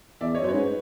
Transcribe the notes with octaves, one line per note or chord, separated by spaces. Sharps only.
E2 D5 E5
C#5 D#5
F#2 C5
G#2 B4 C#5